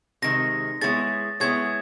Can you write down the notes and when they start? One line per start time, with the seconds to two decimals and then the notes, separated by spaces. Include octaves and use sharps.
0.22 C3 D#3 G#3 A#6
0.81 G#3 B3 E4 G#4 C#5 A6
1.40 G#3 B3 E4 G#4 C#5 G#6